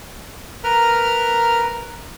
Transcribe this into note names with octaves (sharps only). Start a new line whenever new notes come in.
A#4 B4 A#5 F6